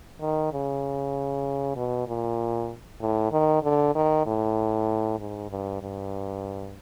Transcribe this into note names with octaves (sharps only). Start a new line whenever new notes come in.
D#3
C#3
B2
A#2
A2
D#3
D3
D#3
A2
G#2
G2
G2